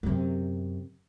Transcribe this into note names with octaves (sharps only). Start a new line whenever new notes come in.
F#2 C3